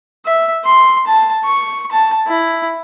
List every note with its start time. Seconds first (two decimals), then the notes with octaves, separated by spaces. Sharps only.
0.25 E5
0.64 C6
1.07 A5
1.44 C#6
1.91 A5
2.27 E4